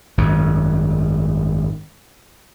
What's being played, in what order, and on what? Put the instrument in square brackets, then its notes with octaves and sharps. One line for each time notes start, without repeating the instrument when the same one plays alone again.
[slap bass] G#1 F#2